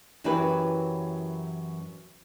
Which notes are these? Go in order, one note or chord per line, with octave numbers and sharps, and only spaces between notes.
F#2 E3 F#3 G4 A#4 B4